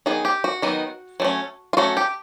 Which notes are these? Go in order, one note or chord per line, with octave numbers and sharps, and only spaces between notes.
D#3 F#3 B3 D#4 G#4
G4
F#4
D#3 F#3 B3 D#4
F#3 A3 C#4
F4
F#3 A3 C#4 F#4
G4